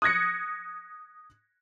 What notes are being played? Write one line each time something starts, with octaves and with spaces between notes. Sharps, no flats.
D#6 F#6 G#6 A#6 C#7